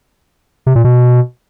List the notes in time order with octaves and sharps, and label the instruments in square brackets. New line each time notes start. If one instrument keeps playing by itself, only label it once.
[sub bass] C3
A#2
B2